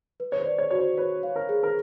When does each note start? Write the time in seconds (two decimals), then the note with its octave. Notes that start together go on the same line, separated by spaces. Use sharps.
0.20 B4
0.32 C#5
0.40 C5
0.46 D5
0.58 C#5
0.71 F#4 C#5
0.78 C5
0.97 B4 C#5
1.23 F5
1.36 A#4
1.49 G#4
1.63 A#4